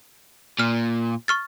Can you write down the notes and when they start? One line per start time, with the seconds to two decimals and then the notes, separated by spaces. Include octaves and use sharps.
0.60 A#2 F6
1.28 C#6 F6 A6